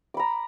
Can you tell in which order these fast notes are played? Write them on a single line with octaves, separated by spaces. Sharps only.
D6 B5 A#5